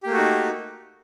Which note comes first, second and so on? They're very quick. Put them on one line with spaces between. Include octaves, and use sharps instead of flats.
G4 A#3 A3 F#4 D#4